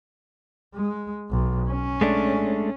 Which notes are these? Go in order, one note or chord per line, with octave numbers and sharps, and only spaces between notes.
G#3
B1
C#4
G#3 A3 D4